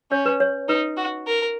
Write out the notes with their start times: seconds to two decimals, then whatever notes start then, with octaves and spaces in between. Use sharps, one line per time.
0.11 C#4 C#5
0.26 B4
0.40 C#5
0.68 D#4 B4
0.97 F#4
1.27 A#4